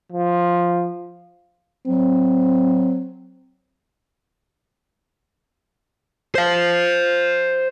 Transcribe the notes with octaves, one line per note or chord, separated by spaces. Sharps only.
F3
F#3 C4
C5 F5